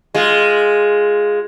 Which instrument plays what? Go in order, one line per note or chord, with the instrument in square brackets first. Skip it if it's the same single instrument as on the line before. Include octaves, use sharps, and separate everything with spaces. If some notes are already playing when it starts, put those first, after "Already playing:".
[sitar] G#3 F4